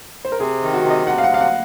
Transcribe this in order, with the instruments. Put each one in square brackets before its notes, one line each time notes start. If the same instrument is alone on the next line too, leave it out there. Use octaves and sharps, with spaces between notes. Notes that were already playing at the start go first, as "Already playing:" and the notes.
[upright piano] C5
A#4
[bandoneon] C3 [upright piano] G#4
[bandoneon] D#3
[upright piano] F#4
[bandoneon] C3
[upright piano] D#5
[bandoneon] C3 [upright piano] F#5
[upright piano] F5
F#5
[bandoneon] C3 [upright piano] F5
[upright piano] F#5